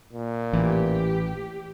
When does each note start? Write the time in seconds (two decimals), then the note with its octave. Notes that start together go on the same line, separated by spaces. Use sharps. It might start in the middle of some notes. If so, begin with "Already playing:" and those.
0.13 A#2
0.53 A1 E3 G4